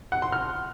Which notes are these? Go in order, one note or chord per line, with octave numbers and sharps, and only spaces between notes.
F#5
C6
F6